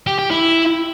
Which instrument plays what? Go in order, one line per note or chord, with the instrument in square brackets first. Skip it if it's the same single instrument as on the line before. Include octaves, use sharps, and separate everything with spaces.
[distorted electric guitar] G4
G4
E4